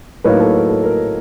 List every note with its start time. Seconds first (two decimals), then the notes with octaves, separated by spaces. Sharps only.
0.24 A2 F#3 A#3 D#4 B4 C#5
0.40 A4 B4
0.54 A#4
0.69 A4
0.83 A#4